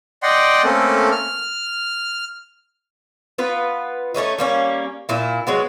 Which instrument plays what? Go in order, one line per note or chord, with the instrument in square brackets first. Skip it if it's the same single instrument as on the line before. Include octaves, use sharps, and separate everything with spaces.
[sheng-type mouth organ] D5 D#5 F#5 G5 C6
A3 A#3 C4 C#4 A4
F6
[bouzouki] B3 F4 B4
A3 A#3 C#4 D#4
G3 A#3 C#4
A#2 E4
F#3 G#3 B3